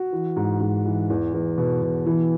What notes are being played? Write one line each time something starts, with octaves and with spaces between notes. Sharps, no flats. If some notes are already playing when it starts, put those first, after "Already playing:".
Already playing: F#4
E3
G#2
G#2
E3
E2
E2
B2
B2
E3